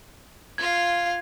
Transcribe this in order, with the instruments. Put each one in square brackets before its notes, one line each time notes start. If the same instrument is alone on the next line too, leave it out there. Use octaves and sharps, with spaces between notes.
[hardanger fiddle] F4 F5 [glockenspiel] G#6